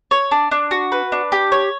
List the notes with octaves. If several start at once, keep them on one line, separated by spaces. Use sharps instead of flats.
C#5
D4
D4
F#4
B4
D4
G4
C#5